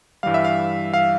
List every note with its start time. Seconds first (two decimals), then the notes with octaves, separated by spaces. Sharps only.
0.23 G2 E3 G3 F5
0.34 E5
0.44 F5
0.94 F5